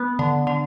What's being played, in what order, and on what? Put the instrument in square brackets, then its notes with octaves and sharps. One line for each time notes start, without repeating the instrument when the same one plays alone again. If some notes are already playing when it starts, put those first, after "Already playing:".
Already playing: [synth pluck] B3
D3
D3